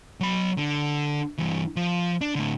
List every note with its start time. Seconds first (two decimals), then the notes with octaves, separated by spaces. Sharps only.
0.20 F#3 B5
0.58 D3
1.38 G2 E3
1.76 F3
2.21 D4
2.35 A2 D3